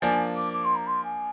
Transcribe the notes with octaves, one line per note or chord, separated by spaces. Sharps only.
F3 A#3 D4 G#5
D6
D6
C6
A#5
C6
G#5